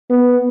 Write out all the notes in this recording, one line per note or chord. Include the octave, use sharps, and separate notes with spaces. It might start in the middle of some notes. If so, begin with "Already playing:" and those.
B3